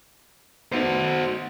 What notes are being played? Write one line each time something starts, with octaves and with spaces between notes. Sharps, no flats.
B3 D#4 F#4 C5